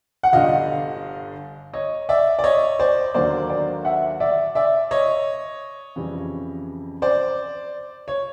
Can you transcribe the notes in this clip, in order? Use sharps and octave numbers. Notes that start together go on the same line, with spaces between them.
F#5
G1 G2 D3 D#5 F5
C#5 D#5
D5 E5
D5
C#5 D#5
C5 D5
D#2 D3 F#3 A#3 C5 D5
C5 D5
E5 F#5
D5 E5
D5 E5
C#5 D#5
F2 C#3 E3 G3
C5 D5
C#5